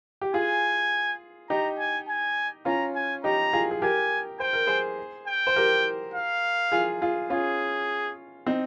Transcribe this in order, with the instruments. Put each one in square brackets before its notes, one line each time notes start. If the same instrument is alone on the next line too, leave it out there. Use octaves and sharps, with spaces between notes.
[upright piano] G4
[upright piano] F4 G#4 [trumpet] G#5
[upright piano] D#4 G4 [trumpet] A#5
[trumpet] G#5
G#5
[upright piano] C#4 F4 [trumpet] A#5
[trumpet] G#5
[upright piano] D#4 G4 [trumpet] A#5
[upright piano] F4 G#4
G#4
[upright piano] G4 A#4 [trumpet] G#5
[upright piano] C5 [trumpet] G5
[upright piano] A#4
G#4 C5
[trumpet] G5
[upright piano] C5
G4 A#4
[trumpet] F5
[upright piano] F4 G#4
F4 G#4
[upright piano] C#4 F4 [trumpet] G#4
[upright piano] C4 D#4